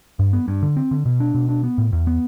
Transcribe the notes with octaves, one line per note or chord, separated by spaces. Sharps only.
G2
B3
G2
D3
C4
D3
B2
D4
B2
D4
B3
A2
E2
B3